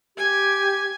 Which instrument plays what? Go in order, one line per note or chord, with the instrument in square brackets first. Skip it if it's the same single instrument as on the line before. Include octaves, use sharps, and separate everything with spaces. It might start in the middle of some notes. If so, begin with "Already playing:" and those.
[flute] G4 [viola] G#5